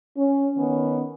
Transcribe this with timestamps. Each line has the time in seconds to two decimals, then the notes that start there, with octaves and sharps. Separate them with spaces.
0.17 C#4
0.57 D#3 B3 C#4